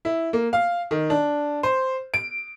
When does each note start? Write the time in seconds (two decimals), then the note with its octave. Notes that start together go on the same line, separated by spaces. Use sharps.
0.05 E4
0.33 A#3
0.53 F5
0.91 D#3
1.10 D4
1.63 C5
2.14 D7